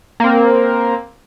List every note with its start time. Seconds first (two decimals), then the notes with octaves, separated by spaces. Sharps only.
0.20 A#3 C4